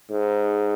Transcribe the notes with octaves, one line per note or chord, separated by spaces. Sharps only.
G#2